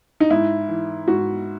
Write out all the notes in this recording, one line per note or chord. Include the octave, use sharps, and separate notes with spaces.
D#4
G#2 E4
E3
G#2 F#4